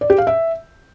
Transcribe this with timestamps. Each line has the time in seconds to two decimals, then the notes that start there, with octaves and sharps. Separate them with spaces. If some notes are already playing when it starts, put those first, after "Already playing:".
0.01 D5
0.10 G4
0.18 F5
0.27 E5